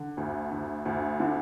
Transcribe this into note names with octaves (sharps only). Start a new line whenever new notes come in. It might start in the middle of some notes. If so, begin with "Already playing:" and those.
Already playing: D3
D2
D2
D2
D3